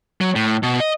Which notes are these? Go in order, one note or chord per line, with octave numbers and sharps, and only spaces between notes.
F#3
A2
B2
D#5